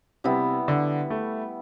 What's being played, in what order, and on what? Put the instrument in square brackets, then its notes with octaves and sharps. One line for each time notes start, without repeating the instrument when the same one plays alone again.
[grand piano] C3 [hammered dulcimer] G3 B3 E4
[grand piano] D3
A3